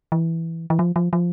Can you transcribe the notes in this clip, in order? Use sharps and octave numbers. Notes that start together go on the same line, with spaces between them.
E3
E3
F3
F3
F3